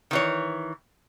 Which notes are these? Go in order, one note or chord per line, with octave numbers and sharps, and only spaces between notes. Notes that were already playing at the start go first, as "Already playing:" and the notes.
D#3 E3 C#5